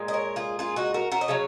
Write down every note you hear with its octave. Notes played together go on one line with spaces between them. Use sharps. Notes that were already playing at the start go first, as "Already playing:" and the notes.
Already playing: A#2 G#3
D#5
A#4 C#5
F4 G#4
F4 G#4
D#4 F#4
F#4 A#4
F#4 A#4
D#5
C#3 F#3 C#5 F5